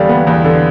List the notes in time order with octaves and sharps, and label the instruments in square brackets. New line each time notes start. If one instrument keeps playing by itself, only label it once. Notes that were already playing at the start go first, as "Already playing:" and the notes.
Already playing: [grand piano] E2 D3 G3 F5
B3
E2
D3